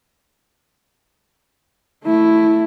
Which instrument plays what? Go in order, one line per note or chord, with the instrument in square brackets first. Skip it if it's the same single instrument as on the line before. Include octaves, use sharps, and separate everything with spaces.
[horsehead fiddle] A3 E4